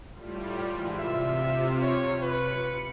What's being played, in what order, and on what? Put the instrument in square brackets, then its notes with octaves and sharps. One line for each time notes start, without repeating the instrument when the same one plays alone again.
[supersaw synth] A2 G3 [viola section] F4
[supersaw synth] G#2 D3 E3
[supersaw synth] C3 [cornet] E5
[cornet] C#5
[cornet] B4 [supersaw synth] C#7